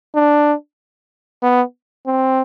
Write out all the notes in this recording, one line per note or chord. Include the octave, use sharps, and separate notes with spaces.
D4
B3
C4